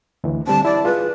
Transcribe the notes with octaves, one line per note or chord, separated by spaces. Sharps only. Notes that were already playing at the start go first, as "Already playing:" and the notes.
D2 E3
D3 G3 C4 A5
E4 D5
F4 G#4 B4